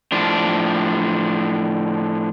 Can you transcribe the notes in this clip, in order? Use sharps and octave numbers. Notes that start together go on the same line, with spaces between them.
A2 F3 D4